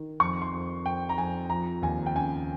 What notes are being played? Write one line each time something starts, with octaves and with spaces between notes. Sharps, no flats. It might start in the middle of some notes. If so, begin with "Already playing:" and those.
Already playing: D#3
F2 C#6
C6
F2
F2 G5
A#5
F2 G#5
F3 A#5
D#2 G#5
G5
C#3 G#5